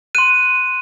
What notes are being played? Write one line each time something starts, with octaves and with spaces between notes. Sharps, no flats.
C6 F#6 D#7